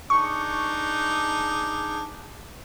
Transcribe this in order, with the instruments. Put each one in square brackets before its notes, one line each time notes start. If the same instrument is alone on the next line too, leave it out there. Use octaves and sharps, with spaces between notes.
[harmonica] D4 D#4 G#4 [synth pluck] C#6